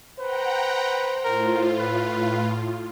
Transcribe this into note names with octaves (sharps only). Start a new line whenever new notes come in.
B4 C5 F#5 G5 A#5
A2 F4 A#4
B4